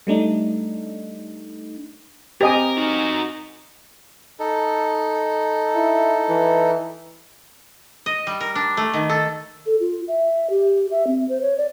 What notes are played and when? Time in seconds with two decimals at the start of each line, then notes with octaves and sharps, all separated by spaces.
0.07 G3 A3 D4 D#4
2.41 C4 G4 A#4 D#5 G#5 D#6
2.77 D#4 F#4 A#4
4.40 D#4 A4
5.76 E4
6.29 E3
8.06 D#5
8.27 G3
8.41 A#4
8.55 D4
8.77 A3
8.93 D#3
9.09 A4
9.66 A4
9.80 F4
10.08 E5
10.50 G4
10.91 E5
11.07 C4
11.29 C5
11.41 C#5
11.58 D5